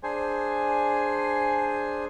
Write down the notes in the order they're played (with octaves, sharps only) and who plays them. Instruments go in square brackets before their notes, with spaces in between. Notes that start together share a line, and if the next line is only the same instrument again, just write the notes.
[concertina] D4 G#4 C5 G#5